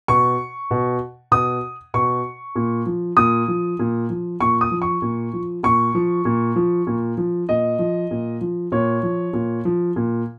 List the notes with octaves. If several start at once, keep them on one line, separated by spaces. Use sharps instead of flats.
B2 C#6
B2
B2 D#6
B2 C#6
A#2
F3
A#2 D#6
F3
A#2
F3
A#2 C#6
D#6
F3
C#6
A#2
F3
A#2 C#6
F3
A#2
F3
A#2
F3
A#2 D#5
F3
A#2
F3
A#2 C#5
F3
A#2
F3
A#2